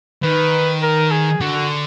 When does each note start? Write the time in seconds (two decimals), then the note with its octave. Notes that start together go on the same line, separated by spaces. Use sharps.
0.23 D#3 B4
0.83 A#4
1.11 G#4
1.41 D3 F#4